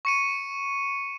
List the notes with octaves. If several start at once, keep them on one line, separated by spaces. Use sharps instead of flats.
C#6 C#7 D#7